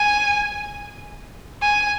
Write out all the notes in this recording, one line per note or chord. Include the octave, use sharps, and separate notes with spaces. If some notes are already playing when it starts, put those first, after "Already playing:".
Already playing: G#5
G#5